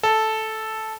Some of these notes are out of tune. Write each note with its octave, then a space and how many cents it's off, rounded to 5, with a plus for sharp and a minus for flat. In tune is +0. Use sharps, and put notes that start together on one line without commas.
A4 -5